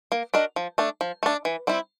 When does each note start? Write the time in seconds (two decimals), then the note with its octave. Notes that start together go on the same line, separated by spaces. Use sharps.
0.12 A#3
0.34 D4 F#4 A#4 D#5
0.56 F3
0.78 A3 D4
1.01 F3
1.23 A3 D4
1.45 E3
1.67 G3 C4 E4